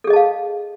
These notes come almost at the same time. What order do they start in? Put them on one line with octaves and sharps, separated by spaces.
A4 G#4 D#5 A5 F5